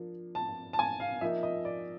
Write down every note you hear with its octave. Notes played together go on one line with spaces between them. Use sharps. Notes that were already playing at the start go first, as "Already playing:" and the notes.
Already playing: F3 A#3 D4
A5
A5
G#5
F5
F3 A#3 D#4 E5
D#5
D5